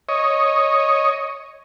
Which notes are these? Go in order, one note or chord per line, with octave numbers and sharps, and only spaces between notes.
C#5 D#5